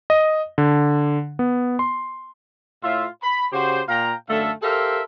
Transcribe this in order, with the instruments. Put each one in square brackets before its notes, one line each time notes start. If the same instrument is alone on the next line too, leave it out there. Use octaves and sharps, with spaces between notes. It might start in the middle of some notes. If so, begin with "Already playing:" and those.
[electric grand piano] D#5
D3
B3
C6
[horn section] A2 F4 E5
B5
C#3 F#4 G4 C5
A#2 F5 G5 A#5
F#2 D3 A3 A4 E5 F5
G4 A4 A#4 C5 E5 F5